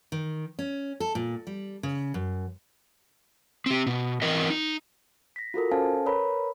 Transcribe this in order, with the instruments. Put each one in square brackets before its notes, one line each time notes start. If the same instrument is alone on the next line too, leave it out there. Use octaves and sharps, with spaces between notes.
[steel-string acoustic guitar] D#3
C#4
A4
A#2
G3
C#3
F#2
[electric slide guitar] C4 G4
B2
E3 C4 A#4 D#5
D#4
[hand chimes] A#6 B6
F4 F#4 A4 A#4
C#4 A4 C5 F5 G#5 A5
A#4 B4 C#5 A#5 B5